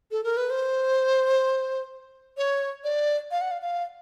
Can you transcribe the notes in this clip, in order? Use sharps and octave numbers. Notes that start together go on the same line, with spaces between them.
A4
A#4
B4
C5
C#5
D5
F5
F#5
F5
F5